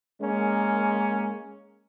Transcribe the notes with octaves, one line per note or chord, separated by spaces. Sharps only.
G#3 A#3 C#4